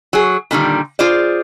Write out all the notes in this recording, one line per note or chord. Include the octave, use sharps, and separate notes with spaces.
F#3 G#4
A#2 D3 D#3 G3
F4 G#4 C5 D5